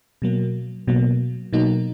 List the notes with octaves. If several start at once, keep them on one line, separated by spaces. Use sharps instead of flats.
B2 F#3 A#3
B2 F#3 A#3
B2 F#3 A#3 D#4